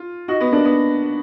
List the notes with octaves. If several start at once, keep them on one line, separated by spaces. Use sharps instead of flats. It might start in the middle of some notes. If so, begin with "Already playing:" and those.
Already playing: F4
D#4 F#4
B3
A#3 D4
B3